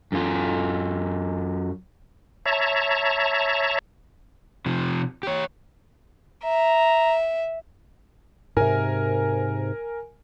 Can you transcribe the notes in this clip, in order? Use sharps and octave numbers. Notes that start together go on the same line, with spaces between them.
F#2 F4
C#5 E5 A5 A#5
C3 F3
G4 C#5
E5 A#5
G#2 C3 A#4 G#5